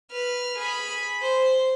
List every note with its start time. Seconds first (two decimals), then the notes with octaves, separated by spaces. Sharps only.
0.12 B4 F6
0.58 G#4 B5
1.22 C5